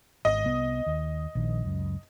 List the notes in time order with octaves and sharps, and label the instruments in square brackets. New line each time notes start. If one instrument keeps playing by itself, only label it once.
[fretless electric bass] G#1 [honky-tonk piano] D#5
[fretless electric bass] C2 B3
D#2
A#1 D#3
C#2 F#2